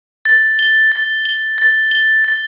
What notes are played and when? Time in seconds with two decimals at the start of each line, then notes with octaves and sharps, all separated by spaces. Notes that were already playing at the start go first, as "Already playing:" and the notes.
0.25 A6
0.59 G7
0.92 A6
1.25 G7
1.58 A6
1.91 G7
2.24 A6